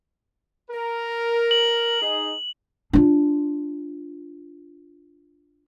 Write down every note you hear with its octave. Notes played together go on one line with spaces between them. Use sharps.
A#4
F#7
D#4 G#4
D4 F4